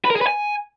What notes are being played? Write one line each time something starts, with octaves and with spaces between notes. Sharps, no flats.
B4
A#4
G#4
B4
G#5